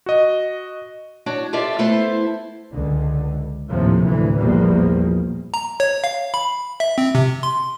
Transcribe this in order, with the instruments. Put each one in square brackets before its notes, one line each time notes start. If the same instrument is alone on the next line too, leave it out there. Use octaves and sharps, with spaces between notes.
[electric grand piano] F#4 D#5
[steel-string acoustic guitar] D4 F#4 C#5
F4 G4 A4 D5 E5
A3 B3 E4 A4 C5
[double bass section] C#2 D3
D#2 A2 C3 F3
D2 E3
A#1 E2 F3 G3 A#3
[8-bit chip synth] A#5
C#5
F5
B5
E5
C4
C3
C6